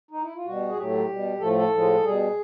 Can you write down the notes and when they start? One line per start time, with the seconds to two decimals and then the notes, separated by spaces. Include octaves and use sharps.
0.11 D#4
0.22 E4
0.34 F4
0.45 B2 G3 F#4
0.68 G#4
0.77 A2 F#3 A3 G4
1.08 B2 G3
1.40 A2 F3 A3 A4
1.57 A4
1.71 A2 F3 G#3
2.03 B2 G3 G#4